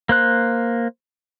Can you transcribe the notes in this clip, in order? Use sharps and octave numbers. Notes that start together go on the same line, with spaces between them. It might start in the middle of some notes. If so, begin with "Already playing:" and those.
A#3 C5 F#6